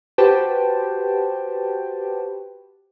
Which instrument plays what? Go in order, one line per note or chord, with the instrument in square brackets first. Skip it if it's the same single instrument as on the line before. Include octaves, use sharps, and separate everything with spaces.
[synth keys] F#4 G4 B4 C5 G5 A5